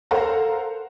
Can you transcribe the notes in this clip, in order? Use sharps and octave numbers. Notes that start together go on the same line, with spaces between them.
A4 A#4 C5 F5 F#5 A#5